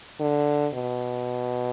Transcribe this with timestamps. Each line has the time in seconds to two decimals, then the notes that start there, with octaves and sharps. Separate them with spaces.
0.20 D3
0.74 B2